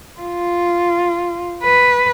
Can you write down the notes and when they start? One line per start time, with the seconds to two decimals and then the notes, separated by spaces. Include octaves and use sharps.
0.21 F4
1.63 B4